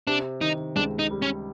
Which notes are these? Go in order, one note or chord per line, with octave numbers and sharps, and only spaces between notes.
C3 D4
D#3 D#4
C#2 D4
D#4
G3
C#4